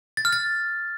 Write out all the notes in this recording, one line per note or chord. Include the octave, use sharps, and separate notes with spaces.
A6
F6
A6